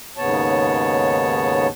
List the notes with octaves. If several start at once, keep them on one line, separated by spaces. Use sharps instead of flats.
D#2 G#2 C#3 B3 C#5 A5